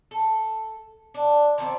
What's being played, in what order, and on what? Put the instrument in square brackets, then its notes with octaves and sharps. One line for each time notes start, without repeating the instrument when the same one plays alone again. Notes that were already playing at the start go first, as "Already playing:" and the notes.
[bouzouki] A4
D4
D#3 F3 C4 D5